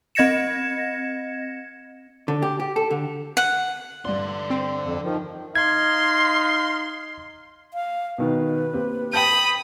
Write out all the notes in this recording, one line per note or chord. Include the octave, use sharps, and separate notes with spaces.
C4 D#5 G#6 A#6 C#7 E7
D3
G4
G4
A4
D3
F#5
G2 D3 D5 C6
C4
F2
D#3 F3
D#4 F5 C6 G#6
F5
B2 D#3 B4
A#3 C4 G4
G5 A5 B5 D#6 G6